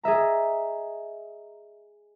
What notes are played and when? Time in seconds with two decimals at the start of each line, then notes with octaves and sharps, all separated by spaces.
0.03 G#4 D#5 E5 A#5